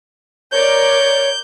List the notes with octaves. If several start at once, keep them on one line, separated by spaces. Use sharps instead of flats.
A#4 C#5 D5 G6